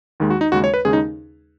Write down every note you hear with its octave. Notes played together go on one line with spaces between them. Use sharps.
D#2 D#3 G#3
F#4
D#4
D#2 C#3 G#3 F#4
C#5
B4
D#2 C#3 G#3 G#4
D#4